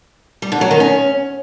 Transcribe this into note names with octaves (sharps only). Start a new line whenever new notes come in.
G3
D3
F#3
D#3
C#4